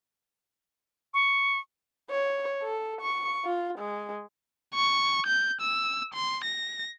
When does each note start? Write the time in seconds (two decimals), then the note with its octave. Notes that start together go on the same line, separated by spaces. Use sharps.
1.14 C#6
2.10 C#5
2.63 A4
3.01 C#6
3.45 F4
3.79 G#3
4.74 C#6
5.27 G6
5.61 E6
6.14 C6
6.44 A#6